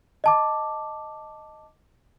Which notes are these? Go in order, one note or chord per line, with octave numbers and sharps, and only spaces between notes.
D#5 A5 D6